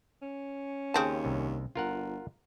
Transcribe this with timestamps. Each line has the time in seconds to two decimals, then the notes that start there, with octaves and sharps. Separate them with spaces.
0.22 C#4
0.94 D#2 C#3 C4 A5
1.25 C2
1.75 G1 F4 A#4 F#5